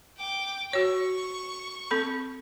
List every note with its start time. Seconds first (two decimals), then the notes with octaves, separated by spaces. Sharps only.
0.18 G5 D6
0.73 F#4 C#5 C#6
1.91 C4 A4 B5